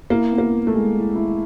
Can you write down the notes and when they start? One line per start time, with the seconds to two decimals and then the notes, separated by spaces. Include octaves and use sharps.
0.10 A#3 E4
0.32 B3
0.38 A#3
0.52 E4
0.67 A3
0.74 G#3
0.95 E4
1.15 E4